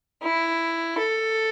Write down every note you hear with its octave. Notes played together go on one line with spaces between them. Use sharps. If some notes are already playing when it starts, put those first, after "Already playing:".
E4
A4